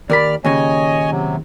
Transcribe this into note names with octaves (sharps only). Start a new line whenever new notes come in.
D#2 A#4 D5 B5 F6
D#2 A#2 C#3 C#5 D#5 G#5
C3 F#3